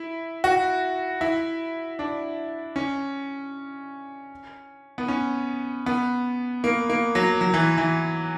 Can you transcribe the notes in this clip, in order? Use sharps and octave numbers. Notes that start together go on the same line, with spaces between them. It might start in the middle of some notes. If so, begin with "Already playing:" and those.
Already playing: E4
F#4
E4
D4
C#4
B3
C#4
B3
A#3
A#3
F#3
F#3
E3
E3